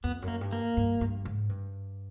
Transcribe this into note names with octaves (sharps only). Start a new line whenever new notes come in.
F2 B3
F#2
A#3
G2
A#3
G2
G2
G#2
G2